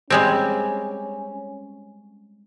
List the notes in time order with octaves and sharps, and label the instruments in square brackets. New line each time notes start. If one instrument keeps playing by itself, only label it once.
[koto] G3 G#3 C4 [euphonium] C#4